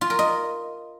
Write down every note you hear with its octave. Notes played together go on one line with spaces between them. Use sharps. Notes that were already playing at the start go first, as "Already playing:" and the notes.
F4
A#4
D#5